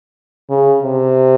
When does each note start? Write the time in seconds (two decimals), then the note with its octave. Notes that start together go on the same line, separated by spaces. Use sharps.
0.50 C#3
0.82 C3